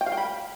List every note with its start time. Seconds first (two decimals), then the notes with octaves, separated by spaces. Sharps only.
0.01 G5
0.06 F5
0.12 G5
0.17 B5